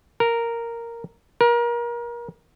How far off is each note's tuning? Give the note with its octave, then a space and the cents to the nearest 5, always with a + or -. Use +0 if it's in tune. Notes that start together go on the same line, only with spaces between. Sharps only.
A#4 -5
A#4 +30